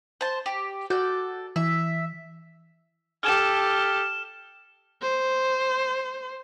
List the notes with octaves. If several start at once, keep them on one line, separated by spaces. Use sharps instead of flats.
C5 A5
G4
F#4 A4 D5 G6
E3 E5
G4 A4 F6 E7
C5